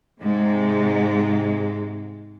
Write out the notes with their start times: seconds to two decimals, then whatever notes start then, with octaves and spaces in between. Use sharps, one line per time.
0.20 G#2 C3 G#3